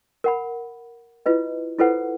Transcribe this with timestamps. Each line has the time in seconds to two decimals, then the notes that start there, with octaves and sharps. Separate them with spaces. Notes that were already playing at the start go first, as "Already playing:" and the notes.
0.24 A#4 F#5 B5
1.26 E4 F4 B4 D#5
1.79 E4 F4 A4 B4 C5 F#5